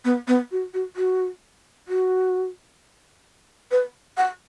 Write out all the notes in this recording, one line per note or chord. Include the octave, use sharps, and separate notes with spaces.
B3
B3
F#4
F#4
F#4
F#4
B4
F#5